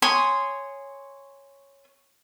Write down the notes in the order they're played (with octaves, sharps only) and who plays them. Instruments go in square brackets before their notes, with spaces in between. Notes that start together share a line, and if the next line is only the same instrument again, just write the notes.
[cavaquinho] C#5 G#5 C6 D#6